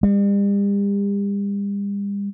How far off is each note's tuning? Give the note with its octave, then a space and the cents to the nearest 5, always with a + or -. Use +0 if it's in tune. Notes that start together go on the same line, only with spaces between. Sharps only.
G3 +40